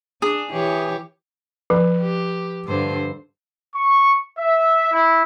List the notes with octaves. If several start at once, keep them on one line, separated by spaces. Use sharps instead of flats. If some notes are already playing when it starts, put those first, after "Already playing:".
D4 G#4
E3 G4 C#5
F3 B4
G4
G2 D3 C5
C#6
E5
E4